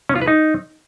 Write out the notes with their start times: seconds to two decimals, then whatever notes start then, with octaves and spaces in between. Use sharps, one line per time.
0.09 C#4
0.15 F4
0.21 B4
0.28 D#4